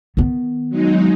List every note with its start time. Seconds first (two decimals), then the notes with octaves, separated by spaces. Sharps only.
0.17 D#3 B3
0.69 F#3 G#3 D#4